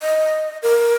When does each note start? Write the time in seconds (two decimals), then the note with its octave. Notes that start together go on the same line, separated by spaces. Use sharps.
0.02 D#5
0.63 A#4